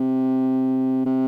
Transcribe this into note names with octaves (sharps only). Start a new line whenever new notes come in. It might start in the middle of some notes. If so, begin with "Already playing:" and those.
Already playing: C3
C3